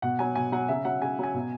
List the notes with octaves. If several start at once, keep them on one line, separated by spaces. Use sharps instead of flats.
B2 F#5
F#3 G#5
B2 G#5
F#3 F#5
C#3 E5
F#3 F#5
C#3 G#5
F#3 G#5
B2